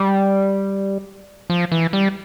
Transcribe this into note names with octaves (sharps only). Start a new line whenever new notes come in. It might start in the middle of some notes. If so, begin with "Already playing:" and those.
Already playing: G3
F3
E3
G3